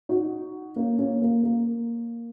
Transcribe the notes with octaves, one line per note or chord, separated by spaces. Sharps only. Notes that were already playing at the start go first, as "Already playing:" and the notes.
D#4 F#4
A#3 C#4
A#3 C#4
A#3
A#3